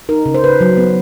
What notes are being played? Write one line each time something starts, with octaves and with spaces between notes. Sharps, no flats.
D#4 A#4
C#3
C5
C#3 B4
F#3
B3